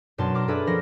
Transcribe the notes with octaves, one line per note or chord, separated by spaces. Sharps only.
F#2 B2 D4 A5 C6
A5 A#5 D6 F6
D4 G#4 A4 B4 E5 B5
F3 C#4 A#4 C5 F6 A#6